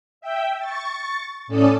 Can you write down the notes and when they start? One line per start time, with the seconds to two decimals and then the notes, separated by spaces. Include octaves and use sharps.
0.21 E5 G5
0.58 C#6 A6
1.47 A2 C#4 A4 D5 D#6